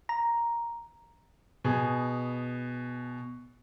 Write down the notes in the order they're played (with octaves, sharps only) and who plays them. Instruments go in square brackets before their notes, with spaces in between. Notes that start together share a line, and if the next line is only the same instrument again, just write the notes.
[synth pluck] A#5
[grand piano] B2 G#4